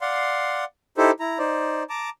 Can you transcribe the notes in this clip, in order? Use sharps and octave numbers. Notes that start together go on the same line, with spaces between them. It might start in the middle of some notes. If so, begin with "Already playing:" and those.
D5 F5 F#5 C6
D#4 E4 G4 A4 C5
E4 A#5
D#4 C5 D5
A5 A#5 D6